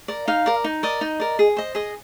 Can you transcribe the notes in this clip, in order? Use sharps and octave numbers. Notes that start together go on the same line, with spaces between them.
A#4 D5
D#4 F5
A#4 D5
D#4
A#4 D5 D#5
D#4
A#4 D5
G#4
C5 D#5
G#4 D#5